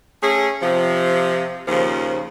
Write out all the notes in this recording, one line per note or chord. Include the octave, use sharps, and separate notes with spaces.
A3 C#4 G#4
C3 F3
D#2 C#3 F3